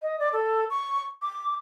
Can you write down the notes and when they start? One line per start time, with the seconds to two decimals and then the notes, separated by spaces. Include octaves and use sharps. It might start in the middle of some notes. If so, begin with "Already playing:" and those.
0.02 D#5
0.19 D5
0.33 A4
0.70 C#6
1.22 D6